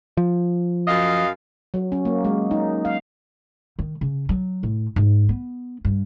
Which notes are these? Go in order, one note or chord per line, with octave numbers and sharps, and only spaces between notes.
F3
F#2 D#5 F5
F#3
C#4
A#3
G#3
D#4
F5
D#3
C#3
F#3
A2
G#2
B3
G2